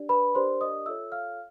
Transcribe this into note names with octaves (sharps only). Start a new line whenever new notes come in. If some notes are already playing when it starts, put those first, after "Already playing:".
Already playing: D4 G4 D5
B4 B5
D4 G4 A#4 C5 D5 C6
D#5 D#6
F4 A4 C#5 E5 E6
F5 F6